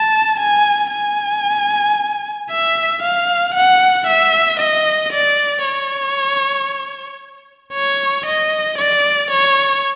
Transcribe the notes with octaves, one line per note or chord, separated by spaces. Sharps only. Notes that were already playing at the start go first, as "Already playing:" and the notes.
Already playing: A5
G#5
G#5
E5
F5
F#5
E5
D#5
D5
C#5
C#5
D#5
D5
C#5